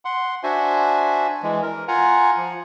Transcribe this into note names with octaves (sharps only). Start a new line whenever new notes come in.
F#5 C6
D4 F#4 C5 E5 G#5
E3 G#3
A#4
F4 F#5 G#5 A#5
F3